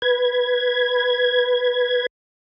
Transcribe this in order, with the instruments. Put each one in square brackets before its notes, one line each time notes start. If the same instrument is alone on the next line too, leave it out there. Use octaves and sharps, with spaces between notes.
[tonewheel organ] B4 G#6